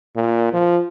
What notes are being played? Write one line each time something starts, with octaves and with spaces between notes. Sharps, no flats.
A#2
F3